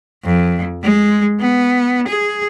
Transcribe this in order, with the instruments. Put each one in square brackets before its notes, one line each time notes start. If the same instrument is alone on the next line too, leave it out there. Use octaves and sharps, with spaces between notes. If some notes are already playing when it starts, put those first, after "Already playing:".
[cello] F2
G#3
B3
G#4